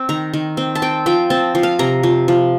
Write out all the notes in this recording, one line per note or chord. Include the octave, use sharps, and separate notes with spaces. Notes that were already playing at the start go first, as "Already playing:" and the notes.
Already playing: C4
D#3 A#5
D#3
C4
A5
C4 G5
F3 G5
C4 A5
F3
F5
C3 A#5
F3
F3